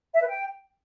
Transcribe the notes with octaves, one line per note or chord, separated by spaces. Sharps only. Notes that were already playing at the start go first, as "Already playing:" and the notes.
E5
B4
G5